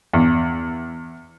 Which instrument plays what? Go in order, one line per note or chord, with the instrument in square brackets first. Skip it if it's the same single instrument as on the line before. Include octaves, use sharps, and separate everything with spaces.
[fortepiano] E2